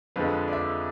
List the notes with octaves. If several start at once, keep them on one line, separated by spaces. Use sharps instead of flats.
F2 D3 F3 G#3 B4
D5
E5